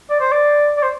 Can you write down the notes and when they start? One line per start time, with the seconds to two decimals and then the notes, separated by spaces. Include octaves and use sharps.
0.10 D5
0.20 C5
0.32 D5
0.77 D5
0.83 C5